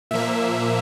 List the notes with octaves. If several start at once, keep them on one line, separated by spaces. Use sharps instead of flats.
A#2 F3 A#3 E5